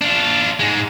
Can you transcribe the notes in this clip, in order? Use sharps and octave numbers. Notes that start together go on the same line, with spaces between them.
D4 F4
G#2 G#3